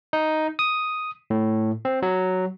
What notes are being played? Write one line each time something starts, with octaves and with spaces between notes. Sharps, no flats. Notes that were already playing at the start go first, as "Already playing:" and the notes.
D#4
D#6
A2
C4
F#3